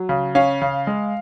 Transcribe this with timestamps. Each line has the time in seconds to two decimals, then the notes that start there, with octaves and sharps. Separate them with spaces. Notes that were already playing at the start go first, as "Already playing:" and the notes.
Already playing: F#3
0.09 C#3
0.35 C#4 F5
0.62 C#3
0.87 G#3